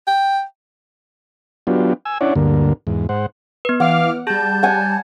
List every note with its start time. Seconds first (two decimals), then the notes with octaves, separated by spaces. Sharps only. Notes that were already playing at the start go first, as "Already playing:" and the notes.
0.07 G5
1.67 F#3 B3 D4 F4 G4
2.05 G#5 E6
2.21 C#4 D4 E4 C#5 D5 F#5
2.36 D2 G2 D3 A#3
2.87 E2 G#2
3.09 G#2 C5 F#5
3.65 B3 B4
3.80 E3 F5 F#5 D6 F6
4.27 G3 G#4 A5 G6
4.63 F#5 G#5